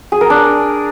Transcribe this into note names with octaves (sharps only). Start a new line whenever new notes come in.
G#4
A#4
D4